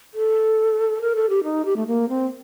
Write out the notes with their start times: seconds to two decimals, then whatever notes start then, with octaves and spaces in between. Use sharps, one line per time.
0.14 A4
1.01 A#4
1.15 A4
1.29 G4
1.44 D#4
1.65 G4
1.76 A3
1.87 A#3
2.09 C4